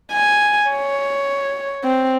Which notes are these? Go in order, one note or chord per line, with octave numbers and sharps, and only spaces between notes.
G#5
C#5
C4